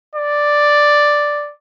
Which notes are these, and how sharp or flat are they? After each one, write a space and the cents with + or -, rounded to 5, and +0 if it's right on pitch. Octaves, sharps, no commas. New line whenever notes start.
D5 +0